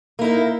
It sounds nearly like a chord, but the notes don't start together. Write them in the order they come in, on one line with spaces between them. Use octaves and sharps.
A#3 E4 D#4